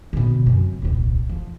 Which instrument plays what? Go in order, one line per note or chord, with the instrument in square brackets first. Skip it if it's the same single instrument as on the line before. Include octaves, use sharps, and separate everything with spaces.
[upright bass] B2 D3
F#2 C3
D#1 C2
F3